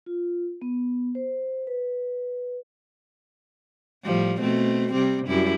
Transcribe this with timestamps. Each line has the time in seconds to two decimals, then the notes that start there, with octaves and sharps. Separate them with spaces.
0.06 F4
0.62 B3
1.15 C5
1.67 B4
4.04 A2 F3 G3
4.39 B2 A3 C4
4.92 C3 G3 C4
5.27 F#2 G3 E4